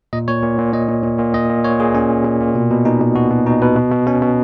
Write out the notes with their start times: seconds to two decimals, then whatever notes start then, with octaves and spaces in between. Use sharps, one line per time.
0.13 A#2 D#5
0.28 A#2 C#5
0.43 A#2
0.58 A#2
0.73 A#2 D#5
0.88 A#2
1.03 A#2
1.19 A#2
1.34 A#2 D#5
1.49 A#2
1.64 A#2 C#5
1.80 A#2 G#4
1.94 A#2 C#4
2.10 A#2
2.25 A#2
2.40 A#2
2.55 B2
2.70 B2
2.85 B2 D#4
3.01 B2
3.16 B2 F#4
3.31 B2
3.46 B2 D#4
3.62 B2 B4
3.77 B2
3.92 B2
4.07 B2 C#4
4.22 B2